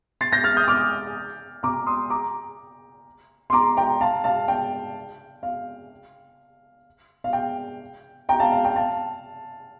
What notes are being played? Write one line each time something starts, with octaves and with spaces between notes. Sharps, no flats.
A6 C7
G6 A#6
F6 A6
D#6 G6
D6 F6
A#5 D6
C6 D#6
A#5 D6
C6
A#5 D6
G5 A#5
F5 A5
F5 A5
G5
F5
F5
G5
G5 A#5
F5 A5
F5
G5
F5 A5